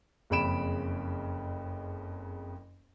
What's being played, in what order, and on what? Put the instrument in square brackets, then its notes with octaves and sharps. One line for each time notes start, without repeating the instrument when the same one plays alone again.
[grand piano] F#1 F2 C#3 B5 D7 E7